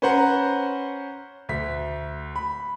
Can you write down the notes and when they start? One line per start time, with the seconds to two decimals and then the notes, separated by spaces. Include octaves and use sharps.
0.02 C#4 B4 C5 F#5 A#5
1.49 D2 B6
2.36 B5